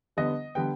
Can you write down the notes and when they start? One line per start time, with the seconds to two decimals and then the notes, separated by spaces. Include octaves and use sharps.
0.17 D3 G3 B3 D#5
0.55 D3 G3 B3 G5